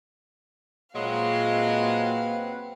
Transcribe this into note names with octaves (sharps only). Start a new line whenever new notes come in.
A#2 F#3 G#3 C4 B4 F5 F#5